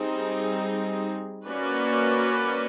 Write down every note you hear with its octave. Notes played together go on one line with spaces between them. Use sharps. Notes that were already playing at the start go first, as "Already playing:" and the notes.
Already playing: G3 C4 D#4 G#4
A#3 C#4 F#4 B4 D5